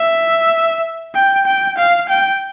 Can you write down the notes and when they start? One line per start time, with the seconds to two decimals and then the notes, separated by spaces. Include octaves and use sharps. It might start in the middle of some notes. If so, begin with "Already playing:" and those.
Already playing: E5
1.15 G5
1.46 G5
1.78 F5
2.09 G5